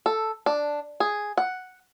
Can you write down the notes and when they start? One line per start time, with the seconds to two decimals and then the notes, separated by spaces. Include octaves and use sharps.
0.06 A4
0.46 D4
1.00 G#4
1.38 F#5